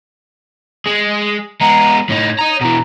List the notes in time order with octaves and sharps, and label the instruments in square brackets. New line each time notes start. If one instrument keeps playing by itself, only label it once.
[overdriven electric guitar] G#3 G#4
[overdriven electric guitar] G#3 B3 [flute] A#5
[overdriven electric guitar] A2 D#4 [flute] C#5
[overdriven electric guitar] D#5 A#5
[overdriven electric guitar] B2 E3 [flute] A#5